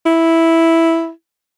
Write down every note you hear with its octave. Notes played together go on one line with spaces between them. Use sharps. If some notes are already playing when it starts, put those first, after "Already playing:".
E4